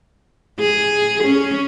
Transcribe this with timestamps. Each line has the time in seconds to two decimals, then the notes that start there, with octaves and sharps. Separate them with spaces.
0.60 G#4
1.24 C#4